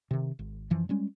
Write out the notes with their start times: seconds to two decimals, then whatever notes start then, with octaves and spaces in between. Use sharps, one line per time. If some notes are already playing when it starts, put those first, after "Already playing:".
0.11 C3 D#3
0.39 G#1
0.70 F#2 E3 F3
0.89 G3 G#3 C#4